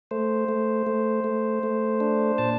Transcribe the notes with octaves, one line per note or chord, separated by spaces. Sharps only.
A3 C5
A3
A3
A3
A3
D4
A#2 A5